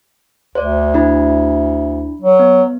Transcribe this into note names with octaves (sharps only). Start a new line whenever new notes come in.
D2 C5 D5
D4 E4 B5
F#3
B3